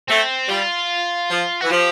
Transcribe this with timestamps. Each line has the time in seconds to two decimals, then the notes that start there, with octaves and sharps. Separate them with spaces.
0.08 A3 C4
0.49 G3 F4
1.29 F3
1.61 E3 F#4
1.70 F3 G4